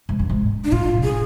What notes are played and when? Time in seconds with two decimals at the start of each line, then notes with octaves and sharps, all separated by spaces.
0.09 G#2
0.19 F#2
0.30 G#2
0.64 D4
0.72 A2 F4
0.97 B2
1.03 A2 G#4